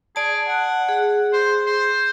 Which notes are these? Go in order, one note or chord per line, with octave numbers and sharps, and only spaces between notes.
G#4 D5 A5
F#5
G#4
C5
C5